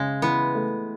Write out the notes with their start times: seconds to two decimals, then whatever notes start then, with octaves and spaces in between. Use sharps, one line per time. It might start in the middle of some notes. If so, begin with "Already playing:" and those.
Already playing: C#3 G#3
0.22 E3 B3
0.55 A3